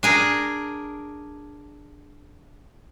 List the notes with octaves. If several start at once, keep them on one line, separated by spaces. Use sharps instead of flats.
D4 G#4 A#4